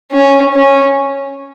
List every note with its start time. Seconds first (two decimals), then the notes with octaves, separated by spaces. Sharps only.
0.11 C#4
0.54 C#4